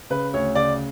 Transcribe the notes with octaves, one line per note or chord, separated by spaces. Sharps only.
C#3 B4
D2 C#5
C#3 D5